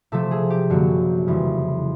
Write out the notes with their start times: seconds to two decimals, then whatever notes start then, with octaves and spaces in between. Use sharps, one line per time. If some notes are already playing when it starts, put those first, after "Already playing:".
0.12 C3 F3 A3 A4
0.31 G#4
0.50 G4
0.70 F#2 D3 G3 A#3 F#4
1.27 F2 C#3 E3 G3